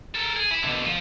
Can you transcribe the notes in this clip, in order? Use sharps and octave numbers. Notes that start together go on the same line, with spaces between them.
A4 A#4
G#4
E4
B2 D3
F3